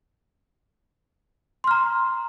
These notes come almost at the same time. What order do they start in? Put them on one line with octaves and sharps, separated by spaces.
C6 F6 A#5